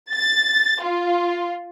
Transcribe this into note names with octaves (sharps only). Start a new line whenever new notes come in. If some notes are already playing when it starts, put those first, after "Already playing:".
A6
F4